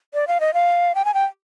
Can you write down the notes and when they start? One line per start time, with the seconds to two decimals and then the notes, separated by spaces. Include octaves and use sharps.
0.14 D5
0.28 F5
0.40 D#5
0.54 F5
0.95 G5
1.05 G#5
1.14 G5